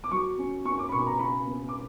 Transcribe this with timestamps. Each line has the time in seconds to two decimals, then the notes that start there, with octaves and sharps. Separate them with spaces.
0.04 D6
0.11 F#3 C#6
0.38 C#4
0.65 C#4 C#6
0.79 D6
0.89 B5
0.92 B2 C#6
1.06 A#5
1.19 C#3 B5
1.46 B3
1.69 D6